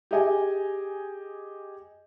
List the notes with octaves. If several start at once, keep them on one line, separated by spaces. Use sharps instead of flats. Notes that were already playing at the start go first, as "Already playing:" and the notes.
G4 G#4 D#5 G#5